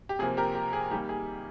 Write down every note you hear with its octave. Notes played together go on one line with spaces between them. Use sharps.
G4
C3 F3 A#3 G#4
G4 A#4
G4
G#4
D#3 G3 A#3 G4
G#4